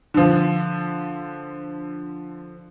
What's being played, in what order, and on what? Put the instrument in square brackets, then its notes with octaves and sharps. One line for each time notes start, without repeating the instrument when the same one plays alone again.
[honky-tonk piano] D3 F3